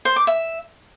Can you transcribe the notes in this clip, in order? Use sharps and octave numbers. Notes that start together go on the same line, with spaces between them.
C5
D6
E5